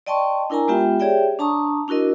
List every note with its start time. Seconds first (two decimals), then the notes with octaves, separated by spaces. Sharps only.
0.07 D5 D#5 G5 A5 C6 C#6
0.50 D4 E4 A#4 G#5 A#5
0.68 G#3 B3 F4 G4 E5 G5
1.00 G4 G#4 C#5 D5 E5 G5
1.39 D4 A5 A#5 C#6 D#6
1.88 D4 E4 F#4 A#4 D#5